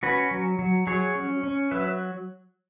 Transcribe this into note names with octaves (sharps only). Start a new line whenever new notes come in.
C#4 F#4 B4
F#3
F#3
F#3 G#4 C#5
C#4
C#4
F#3 B4 E5